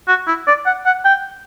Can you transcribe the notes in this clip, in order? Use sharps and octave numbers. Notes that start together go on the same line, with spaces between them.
F#4
E4
D5
F#5
F#5
G5